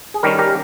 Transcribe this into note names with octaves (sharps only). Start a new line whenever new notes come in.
G#4
D#3 G3 C#4 G4 A#4
G4 A#4